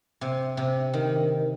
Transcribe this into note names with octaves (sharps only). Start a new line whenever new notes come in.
C3
C3
D#3